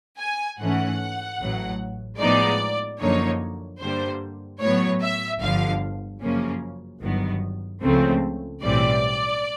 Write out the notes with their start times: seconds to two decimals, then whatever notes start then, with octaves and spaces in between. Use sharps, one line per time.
0.19 G#5
0.59 G#2 E3 A3 C#4 F#5
1.39 A1 A2 F#3
2.19 A2 F3 G#3 B3 D#4 D5
3.00 F#2 D3 F3 A#3 D#4 C#5
3.80 G2 D3 G3 A#3 C5
4.61 A2 F#3 B3 C#5
5.01 E5
5.41 G1 G2 D3 F3 F5
6.21 F#2 C#3 F3 A#3 C#4
7.02 G1 G2 D#3 F#3 B3
7.82 C#2 C#3 F3 A3 C4
8.62 B1 A2 E3 G3 C4 D5